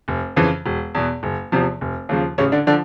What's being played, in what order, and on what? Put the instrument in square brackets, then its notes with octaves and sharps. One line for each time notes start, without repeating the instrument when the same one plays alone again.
[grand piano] F1
F2 C#3 E3
E1
E2 B2
F#1
E2 C3 F3
F1
D#2 C#3 F3
A1 C#3 C#4
D3 D4
D3 F3 D4